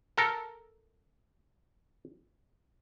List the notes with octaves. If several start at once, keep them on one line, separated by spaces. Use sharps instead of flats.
A4 A#4